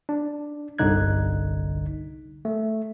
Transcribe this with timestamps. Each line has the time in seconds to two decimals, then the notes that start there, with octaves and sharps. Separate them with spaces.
0.09 D4
0.79 G1 C2 D3 D#4 F#6 G#6
2.45 A3